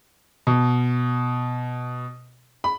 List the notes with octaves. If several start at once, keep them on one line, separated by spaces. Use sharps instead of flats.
B2
B5